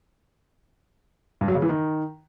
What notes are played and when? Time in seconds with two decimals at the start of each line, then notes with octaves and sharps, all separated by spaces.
1.41 G2
1.48 F#3
1.55 C#3
1.62 E3
1.69 D#3